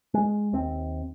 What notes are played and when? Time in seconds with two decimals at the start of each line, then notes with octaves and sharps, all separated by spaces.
0.14 G#3
0.53 D#2 C4